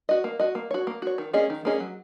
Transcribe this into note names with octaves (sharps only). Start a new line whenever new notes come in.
F#4 D#5
A#3
F#4 D#5
A#3
F#4 C#5
A#3
F#4 C#5
D#3
A#3 C#4 G#4 D#5
D#3
A#3 C#4 G#4 D#5
F#3